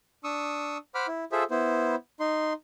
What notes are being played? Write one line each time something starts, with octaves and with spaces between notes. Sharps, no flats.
D4 C#6 D#6 E6
C5 F#5 B5 D6 F6
E4
F4 G#4 A4 C5 E5
B3 E4 C5
D#4 C6